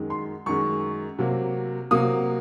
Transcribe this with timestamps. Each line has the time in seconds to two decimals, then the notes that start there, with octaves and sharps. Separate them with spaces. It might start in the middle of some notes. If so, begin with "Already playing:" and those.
Already playing: F#2 D#3 G#3
0.10 C6
0.46 F#2 D#3 G#3 C#6
1.19 C3 F#3 A#3
1.91 C3 F#3 A#3 D#6